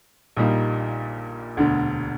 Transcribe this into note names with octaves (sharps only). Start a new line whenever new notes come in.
A#1 A#2 G3 A#3 D#4
E1 D2 D3